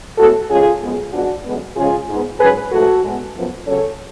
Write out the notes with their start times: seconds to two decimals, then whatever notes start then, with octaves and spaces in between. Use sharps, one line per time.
0.18 A2 G#3 B3 F#4 A4
0.50 C#3 F3 G#3 C#4 F4 G#4
0.81 F#2 F3 G#3 B3
1.13 G#2 F3 G#3 B3 D4 F#4
1.45 F#2 D3 G#3 B3
1.76 C#3 F3 G#3 C#4 F4 G#4
2.08 G#2 G#3 B3
2.40 G#2 F#3 C#4 G#4 B4
2.71 G#2 F3 A3 F#4 A4
3.03 A2 G#3 B3
3.35 F#2 F3 B3
3.66 C#3 F#3 C#4 A4 C#5